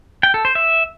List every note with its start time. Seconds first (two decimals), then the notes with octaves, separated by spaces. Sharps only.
0.23 G5
0.34 A4
0.45 C5
0.55 E5